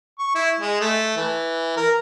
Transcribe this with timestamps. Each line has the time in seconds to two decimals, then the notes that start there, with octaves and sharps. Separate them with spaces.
0.19 C#6
0.35 E4
0.60 G#3
0.81 A3
1.17 E3
1.77 A#4